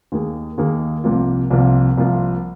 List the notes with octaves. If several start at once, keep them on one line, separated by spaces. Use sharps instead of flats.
D#2 D#3 A#3 G#4
D#2 D#3 A#3 G#4
C2 C3 F3 A#3 F4
C2 C3 F3 A#3 F4
C2 C3 F3 A#3 F4